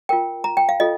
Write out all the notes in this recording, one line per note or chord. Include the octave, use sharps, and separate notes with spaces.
F4 A#4 G5
A#5
G5
F5
F4 A4 D#5